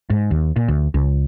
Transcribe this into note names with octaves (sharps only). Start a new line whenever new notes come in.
G#2
D#2
A#2
D2
C#2